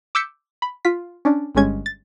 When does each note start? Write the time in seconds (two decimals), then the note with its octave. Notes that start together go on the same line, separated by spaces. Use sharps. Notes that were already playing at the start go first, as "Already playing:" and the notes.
0.15 D6 E6 G6 B6 C#7
0.62 B5
0.85 F4 B6
1.25 C#4 D4
1.55 G1 G2 G#3 C#4 G#6
1.86 A6